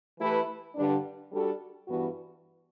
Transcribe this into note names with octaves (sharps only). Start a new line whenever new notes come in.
E3 A3 E4 G4 B4
G2 D3 G3 D4
G3 D4 F#4 A4
G2 E3 B3 F#4